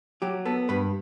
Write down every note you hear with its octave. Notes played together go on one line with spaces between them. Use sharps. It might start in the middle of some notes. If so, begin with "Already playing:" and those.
F#3 G4
B3 A4
G2 B4